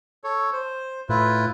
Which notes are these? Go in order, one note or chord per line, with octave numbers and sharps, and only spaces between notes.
A4 C#5
C5
A2 E4 F4 B4